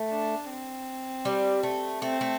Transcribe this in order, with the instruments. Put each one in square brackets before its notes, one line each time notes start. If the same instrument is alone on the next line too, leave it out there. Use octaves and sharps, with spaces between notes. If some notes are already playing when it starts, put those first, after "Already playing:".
Already playing: [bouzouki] A3
[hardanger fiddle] D4
C4
[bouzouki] G3
A3
[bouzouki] A3 [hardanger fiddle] C4
[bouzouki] A3